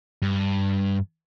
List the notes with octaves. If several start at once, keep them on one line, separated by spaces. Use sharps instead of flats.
G2